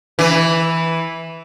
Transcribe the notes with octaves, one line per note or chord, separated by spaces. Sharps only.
E3